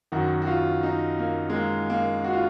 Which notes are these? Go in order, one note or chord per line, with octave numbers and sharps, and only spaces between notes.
F#2 D#3 F#4
F#4
F4
D#4
A#3
G#3
A#3
A#3
F#4
F4